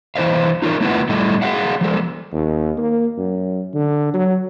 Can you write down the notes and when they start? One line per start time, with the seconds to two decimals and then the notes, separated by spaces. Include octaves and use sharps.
0.15 E3 E4 C5 D#5 F5
0.62 D#4 F4 A#4 C#5
0.81 A3 C4 E4 F4 B4 F#5
1.09 A2 G3 A3 E4 A4 D#5
1.42 G#4 C#5 F5 F#5
1.81 F3 G#3 A4
2.32 D#2
2.78 A#3
3.18 F#2
3.74 D3
4.14 F#3